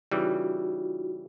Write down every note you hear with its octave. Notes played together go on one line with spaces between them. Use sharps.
C#3 E3 G3 D#4 F4 F#4